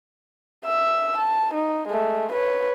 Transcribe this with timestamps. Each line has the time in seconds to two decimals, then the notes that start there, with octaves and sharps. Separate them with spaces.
0.65 E5 E6
1.18 A5
1.54 D#4
1.89 G#3 A3
2.32 B4 C#5